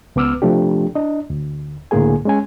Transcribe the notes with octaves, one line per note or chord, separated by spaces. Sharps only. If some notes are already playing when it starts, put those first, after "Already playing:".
C#2 B3 D6 E6 F6
C3 F3 A3 D4 G4
D4 D#5
D2
C#2 A2 D3 A#3 G#4 G#5
G#3 C#4 G#5